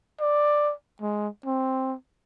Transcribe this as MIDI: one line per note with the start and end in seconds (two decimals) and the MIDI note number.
0.20 0.73 74
1.02 1.28 56
1.46 1.95 60